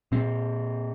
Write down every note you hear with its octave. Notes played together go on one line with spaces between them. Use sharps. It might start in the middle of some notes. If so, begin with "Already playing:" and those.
A#2 C4